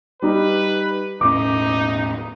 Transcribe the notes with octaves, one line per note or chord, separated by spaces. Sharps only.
G3 D#4 B4
E1 A2 C#4 D#4 D6